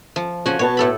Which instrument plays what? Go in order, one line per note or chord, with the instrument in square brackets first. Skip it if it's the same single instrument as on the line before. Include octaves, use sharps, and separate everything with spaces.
[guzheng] F3
[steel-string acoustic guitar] C#3 F3 [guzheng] F#4 F#5 G#5
[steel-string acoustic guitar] B2 B3 A5 [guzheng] C#5
[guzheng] A2 A4 B5